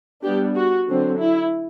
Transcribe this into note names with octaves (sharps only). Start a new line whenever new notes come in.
G3 B3 D4 G4
F#4
D3 F#3 C4
E4